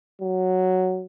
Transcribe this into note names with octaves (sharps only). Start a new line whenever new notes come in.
F#3